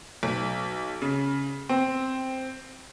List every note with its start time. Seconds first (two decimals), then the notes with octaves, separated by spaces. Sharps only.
0.23 B1
1.02 C#3
1.69 C4